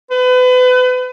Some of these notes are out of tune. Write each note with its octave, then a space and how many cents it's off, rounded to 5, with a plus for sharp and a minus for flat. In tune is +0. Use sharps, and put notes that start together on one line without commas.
B4 +35